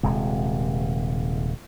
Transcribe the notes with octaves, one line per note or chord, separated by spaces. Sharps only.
D#1 C3 G#3